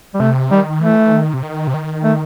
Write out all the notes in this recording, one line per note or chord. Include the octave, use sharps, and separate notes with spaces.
G3
C3 A3
D#3 G3
E3 A3
D#3
C3
D#3
C3
D#3
A3